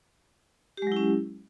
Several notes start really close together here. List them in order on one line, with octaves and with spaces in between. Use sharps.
G4 G#3 F#3 E4 C#4